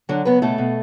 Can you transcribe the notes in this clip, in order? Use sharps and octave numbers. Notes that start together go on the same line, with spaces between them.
D3 F#3 D4
C#3 B3 B4
B2 A3 A4
B2